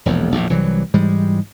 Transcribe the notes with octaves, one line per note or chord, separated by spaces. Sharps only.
E1 A#1 E2
A#1 E2 A2
C2 E3 F#3 G3
G#2 E3 G3 G#3